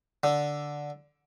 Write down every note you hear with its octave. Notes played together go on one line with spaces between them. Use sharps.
D3